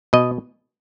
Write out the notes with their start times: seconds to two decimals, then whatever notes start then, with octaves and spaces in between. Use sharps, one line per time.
0.13 B2 D#5